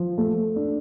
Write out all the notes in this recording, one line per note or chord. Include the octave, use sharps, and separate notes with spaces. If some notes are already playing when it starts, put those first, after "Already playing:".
Already playing: F3
A3
D4